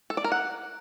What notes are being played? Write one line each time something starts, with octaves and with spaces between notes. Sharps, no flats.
A4
D5
A#4
F#5